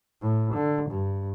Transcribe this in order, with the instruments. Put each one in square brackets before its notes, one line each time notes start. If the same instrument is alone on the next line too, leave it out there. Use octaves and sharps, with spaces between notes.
[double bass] A2
D3
G2